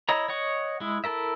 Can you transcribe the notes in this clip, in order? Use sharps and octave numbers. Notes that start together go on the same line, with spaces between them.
E4 C#5 D#5 A#5
C#5 D#5 F#5 C#6
G#3 E4
E4 A4 A#4 E5